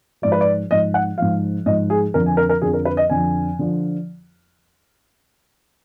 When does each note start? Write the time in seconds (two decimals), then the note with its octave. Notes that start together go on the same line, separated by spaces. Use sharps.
0.22 G#2 F3 D5
0.32 B4
0.41 D5
0.70 G#2 F3 D#5
0.94 F#5
1.18 G#2 F3 F5
1.66 G#2 F3 D#5
1.90 G#4
2.14 F2 D3 F3 A#4
2.26 G#5
2.37 A#4
2.49 A#4
2.62 F2 D3 F3 G#4
2.74 A#4
2.85 B4
2.97 D#5
3.10 F2 D3 F3 G#5
3.59 D3 F3